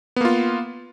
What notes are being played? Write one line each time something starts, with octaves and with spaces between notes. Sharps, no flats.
A#3 B3 F4